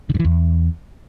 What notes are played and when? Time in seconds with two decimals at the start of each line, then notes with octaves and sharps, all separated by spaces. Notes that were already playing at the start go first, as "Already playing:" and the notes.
0.10 D3
0.15 G2
0.20 E3
0.25 E2